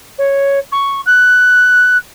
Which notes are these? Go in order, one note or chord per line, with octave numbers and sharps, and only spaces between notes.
C#5
C#6
F#6